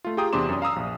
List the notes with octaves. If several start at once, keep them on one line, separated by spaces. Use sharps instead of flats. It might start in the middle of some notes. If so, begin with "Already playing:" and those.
A3 F4
F4 G4 G#4 G5 A#5 D#6
E2 C3 D4 C6 D6 E7
F#2 D#6
F5 A#5 D#6 E6
A#1